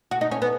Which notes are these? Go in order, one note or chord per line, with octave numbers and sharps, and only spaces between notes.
F#4
D#4
C#4
B3